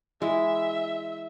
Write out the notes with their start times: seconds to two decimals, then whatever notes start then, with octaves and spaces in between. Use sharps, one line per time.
0.22 E3 G#3 E5